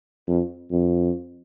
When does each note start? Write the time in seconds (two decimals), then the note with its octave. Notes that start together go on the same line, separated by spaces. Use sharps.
0.28 F2
0.72 F2